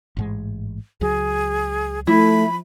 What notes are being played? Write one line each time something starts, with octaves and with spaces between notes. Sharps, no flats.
A1 G#2 G#3
C#2 F#3 G#4
F3 A3 E4 B5